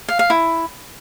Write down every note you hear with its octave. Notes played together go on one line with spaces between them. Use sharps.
F5
F5
E4